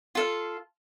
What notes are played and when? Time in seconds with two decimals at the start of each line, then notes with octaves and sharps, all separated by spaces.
0.15 F4 A4 F5